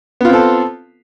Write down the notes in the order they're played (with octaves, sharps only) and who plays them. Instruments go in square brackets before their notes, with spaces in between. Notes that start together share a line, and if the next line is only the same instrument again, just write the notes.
[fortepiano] B3
F4
C4
A4